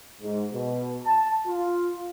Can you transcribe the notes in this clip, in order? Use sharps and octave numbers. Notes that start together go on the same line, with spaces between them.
G#2
B2
A5
F4